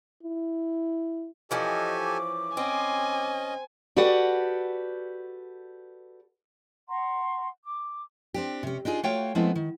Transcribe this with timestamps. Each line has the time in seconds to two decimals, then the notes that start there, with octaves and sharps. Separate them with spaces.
0.23 E4
1.51 E3 F3 C#4 G4 A4 D#5 G#5
2.06 D6
2.57 C4 C#4 D#5 G#5
3.96 F#4 G4 A4 B4 D5 F#5
6.89 F#5 A#5 C6 C#6
7.64 D6
8.34 C4 D4 G4
8.63 C3 C#4
8.85 D4 D#4 F4 G#4
9.03 A3 F4 F#4 C#5 F5 G5
9.35 F3 G#3 A3 B3 C4 E4
9.55 D#3